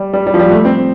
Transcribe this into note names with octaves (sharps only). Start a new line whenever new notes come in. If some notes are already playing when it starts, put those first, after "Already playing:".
Already playing: G3
G3
G3
F3
G3
A3
C4